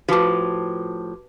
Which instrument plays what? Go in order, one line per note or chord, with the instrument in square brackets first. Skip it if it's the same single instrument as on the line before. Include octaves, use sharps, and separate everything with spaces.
[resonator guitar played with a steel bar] A2 F3 [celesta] F#4 D6 [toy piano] G4 B4 A5